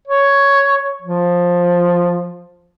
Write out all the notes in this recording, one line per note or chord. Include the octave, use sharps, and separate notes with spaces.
C#5
F3